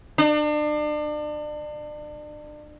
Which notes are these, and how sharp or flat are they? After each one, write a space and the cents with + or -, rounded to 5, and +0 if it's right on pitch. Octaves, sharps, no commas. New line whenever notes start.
D4 +35